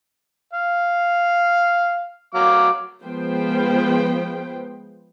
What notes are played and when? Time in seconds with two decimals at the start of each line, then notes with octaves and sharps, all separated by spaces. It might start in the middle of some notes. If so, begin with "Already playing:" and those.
0.53 F5
2.34 F#3 F5 D6
3.04 F3 G#3 B3 B4 C5 G5